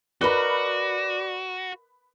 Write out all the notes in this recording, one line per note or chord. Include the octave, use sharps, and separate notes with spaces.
F#4 A#4 B4 D5 D#5 B5 F#6